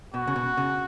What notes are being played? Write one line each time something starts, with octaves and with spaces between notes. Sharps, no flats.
B2 F#4
C#3
B2
C#3